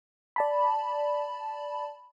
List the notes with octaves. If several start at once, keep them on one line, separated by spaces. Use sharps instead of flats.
D5 A5 B5